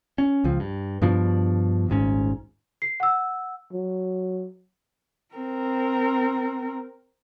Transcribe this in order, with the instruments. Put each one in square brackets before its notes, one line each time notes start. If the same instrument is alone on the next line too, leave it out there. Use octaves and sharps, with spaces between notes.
[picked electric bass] C#4
C#2 F3
G2
G2 B2 F3 D4
D#1 G#1 G#2 C#4
[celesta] C7
F#5 E6
[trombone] F#3
[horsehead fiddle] C4 A#4